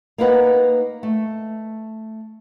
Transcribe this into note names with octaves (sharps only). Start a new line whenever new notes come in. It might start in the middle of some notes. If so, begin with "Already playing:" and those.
A#3 D#4 B4 F#5
A3